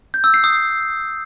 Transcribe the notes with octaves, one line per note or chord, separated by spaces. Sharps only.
G6
E6
C7
D#6